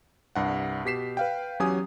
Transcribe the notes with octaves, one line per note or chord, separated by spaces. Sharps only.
C2 G2 F#5
B2 G4 B6 C7 E7
B4 F5 G5
E2 F#3 C#4 G4 G#5 D#6